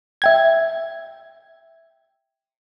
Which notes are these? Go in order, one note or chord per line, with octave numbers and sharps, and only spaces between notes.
E5 G5 G#6